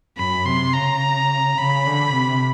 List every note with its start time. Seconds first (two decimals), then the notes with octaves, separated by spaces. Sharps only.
0.17 F#2 B5
0.45 C3 C6
0.73 C#3 A#5
1.57 C#3 B5
1.86 D3
2.14 C3